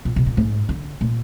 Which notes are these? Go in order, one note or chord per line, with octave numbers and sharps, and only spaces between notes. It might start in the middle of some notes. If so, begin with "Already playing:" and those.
A#2
B2
A#2
G#2
D3
A#2